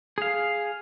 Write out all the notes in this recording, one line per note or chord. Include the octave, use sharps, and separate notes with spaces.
G#4 F5